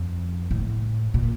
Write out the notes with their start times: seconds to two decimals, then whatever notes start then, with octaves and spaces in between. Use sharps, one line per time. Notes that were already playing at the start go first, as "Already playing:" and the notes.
Already playing: F2
0.51 A2
1.14 A#2